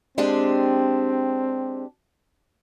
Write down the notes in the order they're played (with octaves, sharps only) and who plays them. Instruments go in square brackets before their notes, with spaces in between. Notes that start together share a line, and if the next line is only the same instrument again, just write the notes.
[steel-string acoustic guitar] G#3 D4 G4 [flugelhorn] C4